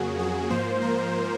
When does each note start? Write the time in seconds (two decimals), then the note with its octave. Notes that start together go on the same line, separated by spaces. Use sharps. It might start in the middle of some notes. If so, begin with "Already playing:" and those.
Already playing: F2 C#3 F#3 A#3 F#4 G#4
0.19 G#4
0.50 G#2 F3 A#3 C5
0.82 A#4